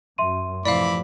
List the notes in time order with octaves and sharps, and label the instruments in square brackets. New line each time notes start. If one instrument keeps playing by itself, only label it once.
[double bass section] F#2 [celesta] E5 C6 D#7
[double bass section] A2 C3 F3 [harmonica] E3 B5 D6 [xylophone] D5 F5